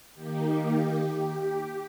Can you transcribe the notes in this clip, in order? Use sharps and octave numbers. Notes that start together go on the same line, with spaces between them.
D#3 A#3 D#4 G4